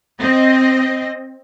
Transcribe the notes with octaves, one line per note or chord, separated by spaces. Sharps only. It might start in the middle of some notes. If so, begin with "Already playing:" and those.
C4 D#5